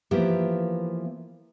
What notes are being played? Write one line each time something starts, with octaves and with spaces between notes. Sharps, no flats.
E3 F3 A#3 B3 E4 G4